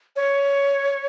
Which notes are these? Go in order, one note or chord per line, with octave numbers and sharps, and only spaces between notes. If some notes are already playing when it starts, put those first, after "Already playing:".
C#5